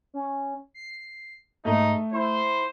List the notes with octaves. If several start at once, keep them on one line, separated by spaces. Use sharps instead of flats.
C#4
C7
G#2 A3 D#4
E4 C5